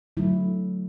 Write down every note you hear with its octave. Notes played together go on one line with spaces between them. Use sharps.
D3 F#3 A3 E4